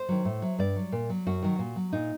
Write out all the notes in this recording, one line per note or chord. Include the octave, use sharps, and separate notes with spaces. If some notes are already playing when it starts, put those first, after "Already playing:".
Already playing: C5
D#3 F#3
A2
F#3
G2 D5
F#3
A#2
F#3
F#2 F#4
D#3 F#3
A#2
F#3
A#2 D#4